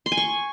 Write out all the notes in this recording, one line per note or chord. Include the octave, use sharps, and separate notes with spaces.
C6
G#5
C#6